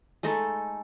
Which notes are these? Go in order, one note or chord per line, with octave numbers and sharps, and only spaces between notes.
G#3 A3 D#4 A4